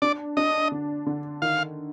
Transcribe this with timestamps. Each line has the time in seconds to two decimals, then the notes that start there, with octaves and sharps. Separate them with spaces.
0.02 D4 D5
0.37 D4 D#5
0.72 D3
1.06 D3
1.42 D#3 F5